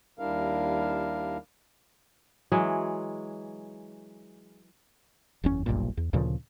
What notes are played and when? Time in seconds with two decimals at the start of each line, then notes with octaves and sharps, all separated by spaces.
0.19 D#2 G3 D4 E4 A#4 F5
2.52 E3 F#3 G#3
5.43 F#1 E2 C#4
5.66 F#1 B1 G2 A#2
5.97 E2
6.13 D2 A#2 C#3 F3